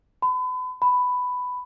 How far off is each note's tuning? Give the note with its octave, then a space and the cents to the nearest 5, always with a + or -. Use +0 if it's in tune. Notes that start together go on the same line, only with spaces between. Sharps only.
B5 +40
B5 +10